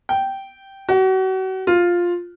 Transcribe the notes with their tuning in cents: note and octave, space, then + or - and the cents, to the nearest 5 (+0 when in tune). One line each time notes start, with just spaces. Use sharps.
G5 -10
F#4 +35
F4 +5